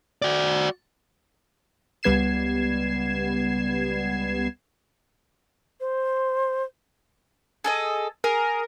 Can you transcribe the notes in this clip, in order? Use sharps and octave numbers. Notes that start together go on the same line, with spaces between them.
F#4 D5
C#2 G3 B3 G#6 C7 E7
C5
G#4 A4 D#5
G#4 A#4